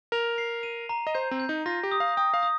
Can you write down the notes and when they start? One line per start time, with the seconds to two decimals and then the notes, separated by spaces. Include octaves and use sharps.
0.12 A#4 F7
0.38 C7
0.63 D#7
0.89 A#5
1.07 D#5
1.15 C5 G6
1.31 C4
1.40 G6
1.49 D#4
1.66 F4 A#6
1.83 G4
1.92 D#6
2.00 F5
2.17 G5 D#6
2.34 F5
2.43 D#6